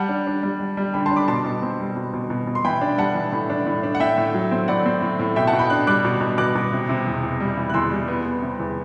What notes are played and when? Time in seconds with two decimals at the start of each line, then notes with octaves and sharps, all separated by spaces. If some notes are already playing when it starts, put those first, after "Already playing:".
Already playing: G3 F#5 A5
0.09 D4
0.27 D4
0.43 G3
0.60 G3
0.77 G3
0.94 D3 G5 B5
1.06 A5 C6
1.11 D4
1.16 B5 D6
1.28 B2 A5 C6
1.45 B2
1.62 C4
1.80 G3
1.97 B2
2.13 B2
2.30 B2
2.47 B2
2.55 C6
2.65 E3 G5 B5
2.81 D4
2.98 G3 F#5 A5
3.15 E3
3.32 A2
3.50 D4
3.67 A2
3.83 D4
3.95 F#5
4.00 A2 E5 G5
4.18 A2
4.34 F#3
4.51 C4
4.68 A2 D5 F#5
4.86 C4
5.02 A2
5.19 A2
5.36 B2 E5 G5
5.47 F#5 A5
5.53 B2
5.59 G5 B5
5.70 D4 F#6
5.87 G3 D6 F#6
6.05 B2
6.21 B2
6.38 B2 D6 F#6
6.55 B2
6.73 C3
6.89 C3
7.07 E2
7.23 E2
7.40 G3
7.57 E3
7.69 F#6
7.74 E2 C6 E6
7.91 G3
8.08 B3
8.25 B3
8.42 C3
8.59 E2